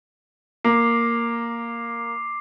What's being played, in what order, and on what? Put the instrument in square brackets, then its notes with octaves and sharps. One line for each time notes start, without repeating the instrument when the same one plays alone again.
[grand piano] A#3 [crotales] D6 C7